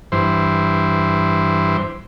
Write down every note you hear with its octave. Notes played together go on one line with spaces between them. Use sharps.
G2 E3 C5